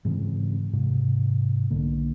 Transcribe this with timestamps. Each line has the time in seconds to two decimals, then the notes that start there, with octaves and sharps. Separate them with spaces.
0.05 G#2 C#3 E3 C4
0.73 G#2 C3
1.70 B1 D3 A#3